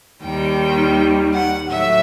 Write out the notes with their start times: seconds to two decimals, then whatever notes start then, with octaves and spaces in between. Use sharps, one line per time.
0.23 D#2 D#3 G3 G5
1.33 F#5
1.69 A2 F#3 E5